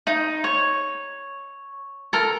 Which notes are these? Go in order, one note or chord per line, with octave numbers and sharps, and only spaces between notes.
D#4
C#5
A4 A#4